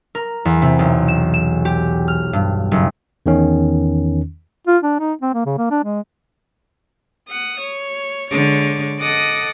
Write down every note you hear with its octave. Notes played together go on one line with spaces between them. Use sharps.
A#4
E2
C3
B1
E7
E7
G4
F6
G2
F#1
E2 D#3 C#4
F4
D4
D#4
C4
A#3
C#3
A#3
D4
G#3
F#5 D#6
C#5
D3 G#3 C#5 D6
A4 D#5 F#5 D6 D#6